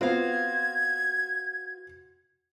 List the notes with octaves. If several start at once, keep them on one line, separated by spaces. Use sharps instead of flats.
B3 C4 F4 F#4 F5 G#6